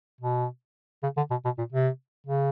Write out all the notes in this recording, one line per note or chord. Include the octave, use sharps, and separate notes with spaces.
B2
C#3
D3
B2
B2
A#2
C3
C#3